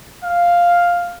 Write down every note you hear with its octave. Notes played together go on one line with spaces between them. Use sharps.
F5